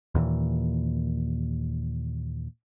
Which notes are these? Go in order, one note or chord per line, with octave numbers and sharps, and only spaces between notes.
D#2 A#2 E3